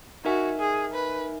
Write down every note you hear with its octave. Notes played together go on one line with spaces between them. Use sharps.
D#4 F#4 A#4 E5 G#5
G#4
B4